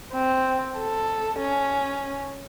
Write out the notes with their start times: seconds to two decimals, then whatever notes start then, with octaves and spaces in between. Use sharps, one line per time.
0.13 C4
0.78 A4
1.39 C#4